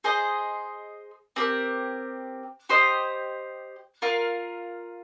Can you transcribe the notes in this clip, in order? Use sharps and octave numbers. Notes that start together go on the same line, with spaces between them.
G#4 C5 D#5
C4 G4 A#4
G4 C5 D#5
F4 A#4 F5